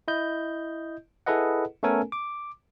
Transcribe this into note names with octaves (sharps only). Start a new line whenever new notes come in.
E4 D#5 G6
E4 G#4 A4 B4 D#5 F#5
A3 B3 C#4 A4 A#4 G#5
D6